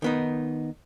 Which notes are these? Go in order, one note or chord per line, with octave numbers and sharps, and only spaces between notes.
D#3 B3 D#4